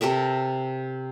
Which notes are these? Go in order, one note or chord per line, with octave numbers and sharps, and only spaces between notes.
C3 A4 A#4 E5